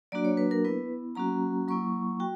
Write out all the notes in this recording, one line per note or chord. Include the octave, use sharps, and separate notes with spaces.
F#3 A#3 D4 F#4 D5
C#5
B4
A#4
B3 E4 B4
F#3 A#3 C#4 F#4 A#5
F#3 A#3 E4 C#6
F#4 G5